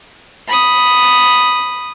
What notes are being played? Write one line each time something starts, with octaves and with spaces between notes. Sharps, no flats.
B5 D#6